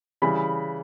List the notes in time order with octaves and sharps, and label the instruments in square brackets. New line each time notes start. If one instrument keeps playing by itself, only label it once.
[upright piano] C#3 E3 G3 B5